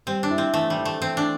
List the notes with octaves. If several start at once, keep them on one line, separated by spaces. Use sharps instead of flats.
G3 C4
D4
E4
C4
E3 A3
G3
E3
A3
E3 C4
D4